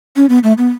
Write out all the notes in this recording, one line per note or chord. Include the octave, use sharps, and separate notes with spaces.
C#4
B3
A3
B3